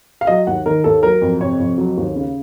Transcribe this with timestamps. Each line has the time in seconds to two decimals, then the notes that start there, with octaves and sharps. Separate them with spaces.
0.21 F5
0.27 F#3 D#5
0.47 D#2 F#5
0.66 D#3 A#4
0.84 D#2 A4
1.03 F#3 A#4
1.21 F2
1.40 C3 C#5
1.60 F2
1.78 F#3
1.97 D#2
2.16 C#3